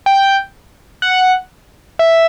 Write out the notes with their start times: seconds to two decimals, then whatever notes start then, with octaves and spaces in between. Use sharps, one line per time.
0.06 G5
1.02 F#5
1.99 E5